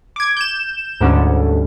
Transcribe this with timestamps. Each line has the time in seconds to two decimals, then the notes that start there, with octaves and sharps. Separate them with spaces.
0.16 D6 G#6
0.37 G6 E7
1.01 D2 G#2 D3 G3 C#4